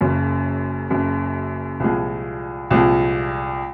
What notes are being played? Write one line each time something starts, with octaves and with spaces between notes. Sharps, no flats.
F#1 F#2 C#3
F#1 F#2 C#3
C2 A#2 F3 G#3
C2 A#2 F3 G#3